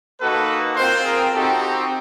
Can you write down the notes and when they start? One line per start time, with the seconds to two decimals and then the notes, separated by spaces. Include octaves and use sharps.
0.21 A#3 D#4 F#4 A4 B4
0.76 C4 F4 A#4 C5
1.05 G#4 A#4
1.33 C4 D#4 F#4 G4 A4
1.61 G4